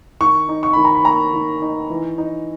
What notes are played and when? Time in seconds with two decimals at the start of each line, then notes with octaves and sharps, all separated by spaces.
0.20 D#3 C#6
0.49 D#4
0.63 C#6
0.73 D#3 B5
0.85 A#5
0.95 B5
1.05 A#3 A#5
1.33 D#3
1.62 D#4
1.90 E3
2.18 D#4